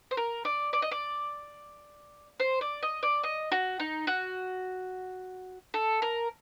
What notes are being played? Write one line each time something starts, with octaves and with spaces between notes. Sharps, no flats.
C5
A#4
D5
D5
D#5
D5
C5
D5
D#5
D5
D#5
F#4
D#4
F#4
A4
A#4